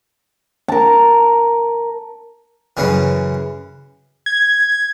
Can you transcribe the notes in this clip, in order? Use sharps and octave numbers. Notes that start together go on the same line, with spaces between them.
A#4 A5
F#2 C#3 E3
G#6